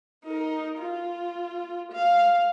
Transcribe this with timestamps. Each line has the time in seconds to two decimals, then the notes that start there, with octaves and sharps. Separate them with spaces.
0.24 D#4 A#4
0.78 F4
1.92 F5